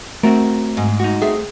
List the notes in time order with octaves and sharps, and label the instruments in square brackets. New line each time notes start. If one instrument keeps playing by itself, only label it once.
[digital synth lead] A3 [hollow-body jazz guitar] C4 F#4 A#4
[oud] G#2
[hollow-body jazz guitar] D#4 F#4
[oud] A3 C4 [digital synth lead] G#4